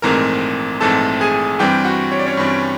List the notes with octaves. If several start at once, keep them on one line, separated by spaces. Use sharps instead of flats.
A#1 G#2 E3 A3 C4 A#4 A#5
A#1 G#2 E3 A3 C4 A4 A5
G#4 G#5
G2 E3 G3 C4 G4 G5
F#4 F#5
C#5
D5
C#4 C#5
G2 E3 G3 C4